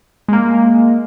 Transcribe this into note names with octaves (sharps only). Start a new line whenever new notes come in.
G#3 A#3